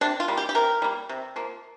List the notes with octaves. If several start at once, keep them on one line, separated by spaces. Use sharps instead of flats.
C3 D4
F4
G3 A#3
G4
G4
C3 A#4
G3 A#3
C3
F3 A#3